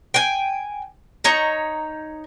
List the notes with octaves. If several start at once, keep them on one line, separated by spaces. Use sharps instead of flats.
G5 G#5
D#4 C#5 A#5